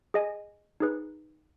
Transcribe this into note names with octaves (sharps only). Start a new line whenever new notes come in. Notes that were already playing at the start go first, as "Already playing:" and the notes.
G#4 D#5 G#5
D#4 G#4 B4